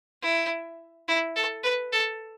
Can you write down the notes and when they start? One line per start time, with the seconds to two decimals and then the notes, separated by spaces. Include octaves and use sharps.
0.22 E4
1.08 E4
1.36 A4
1.64 B4
1.92 A4